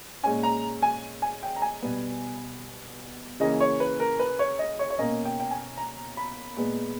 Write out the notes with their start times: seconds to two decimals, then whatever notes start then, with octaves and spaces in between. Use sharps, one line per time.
0.23 A#2 G#3 C#4 G#5
0.43 A#5
0.82 G#5
1.22 G#5
1.43 G5
1.56 A#5
1.62 G#5
1.82 B2 G3 B3
3.40 C#3 E3 A#3 C#4 D#5
3.60 C#5
3.80 B4
4.00 A#4
4.19 B4
4.39 C#5
4.59 D#5
4.79 C#5
4.90 C#5
4.98 B2 A#3 C#4 D#5
5.25 G5
5.40 G5
5.51 G#5
5.78 A#5
6.17 B5
6.56 A#2 G#3 B3